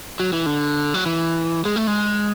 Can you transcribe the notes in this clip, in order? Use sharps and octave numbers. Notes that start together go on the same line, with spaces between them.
F#3
E3
D3
F#3
E3
G#3
A3
G#3